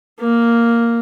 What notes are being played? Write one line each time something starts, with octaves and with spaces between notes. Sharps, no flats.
A#3